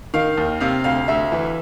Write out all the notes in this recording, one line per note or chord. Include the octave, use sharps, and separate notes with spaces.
D#3 F5
D#2
C3 F5
D2 F5
D2 E5
E3